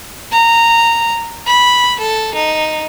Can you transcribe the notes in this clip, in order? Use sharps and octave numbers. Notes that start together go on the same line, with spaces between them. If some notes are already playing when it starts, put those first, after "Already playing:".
A#5
B5
A4
D#4